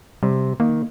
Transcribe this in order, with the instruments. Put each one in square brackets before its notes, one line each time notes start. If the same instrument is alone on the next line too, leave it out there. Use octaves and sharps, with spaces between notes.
[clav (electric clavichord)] C3 [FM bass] G3
[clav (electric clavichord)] D#3 [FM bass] A#3